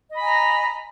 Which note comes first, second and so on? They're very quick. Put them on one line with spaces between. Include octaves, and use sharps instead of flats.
D#5 B5 G#5 A#5